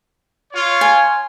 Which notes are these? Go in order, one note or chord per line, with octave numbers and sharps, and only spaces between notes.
F4 C#5
G#5